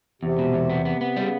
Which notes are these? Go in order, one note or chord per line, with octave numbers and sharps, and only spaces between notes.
E2 C3
B2
E2
B3
B3
B3
C#3 G3